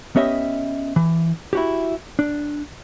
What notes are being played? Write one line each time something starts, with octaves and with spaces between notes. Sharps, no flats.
B3 C#4 G4 D#5 E5
E3
E4 F#4 G4
D4